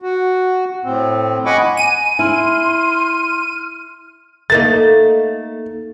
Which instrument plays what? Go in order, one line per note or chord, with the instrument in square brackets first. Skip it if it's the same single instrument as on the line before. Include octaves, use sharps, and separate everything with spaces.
[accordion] F#4
A2 C4
D#5 F#5 G#5 B5 C#6 D6
[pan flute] G#5 [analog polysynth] D#7
[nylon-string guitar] E4 [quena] C6 [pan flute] F6
[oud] A3 A#3 D#4 [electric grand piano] A6